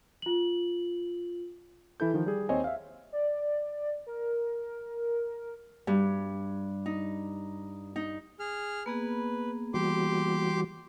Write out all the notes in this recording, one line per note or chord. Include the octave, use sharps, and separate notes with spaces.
F4 F#7
E3 E4 A4 G6
D#3 F3
G3 G#4
D#2 C4 C5 C#5 D#5 G#5
E5 F5
D5
A#4
G2
D#4
D#4
G#4 F6
A#3 B3 G#4 B4
E3 G3 F#4 G4 C6 D6